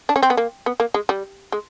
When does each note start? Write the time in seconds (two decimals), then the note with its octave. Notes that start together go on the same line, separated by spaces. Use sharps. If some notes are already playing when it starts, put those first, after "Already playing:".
0.09 D4
0.16 C#4
0.23 C4
0.30 B3
0.37 A#3
0.66 B3
0.80 A#3
0.94 G#3
1.09 G3
1.52 G#3